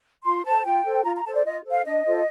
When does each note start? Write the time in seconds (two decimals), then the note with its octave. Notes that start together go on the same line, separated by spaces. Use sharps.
0.25 F4 C6
0.45 A4 C5 A5
0.65 F4 G5
0.85 A4 C5
1.04 F4 A#5
1.16 A#5
1.25 A4 C5 A5
1.34 D5
1.44 F4 D#5
1.64 A4 C5
1.71 F5
1.85 D4 D#5
2.05 F4 A4 C5